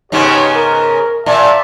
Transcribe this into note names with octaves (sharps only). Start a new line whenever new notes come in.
G#2 C#3 B3 D#4 G4 C#5
A#4
A#2 D5 E5 A5